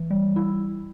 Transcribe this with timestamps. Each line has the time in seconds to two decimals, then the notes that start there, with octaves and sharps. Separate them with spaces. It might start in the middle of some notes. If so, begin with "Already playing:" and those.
Already playing: E3
0.11 G3
0.36 E4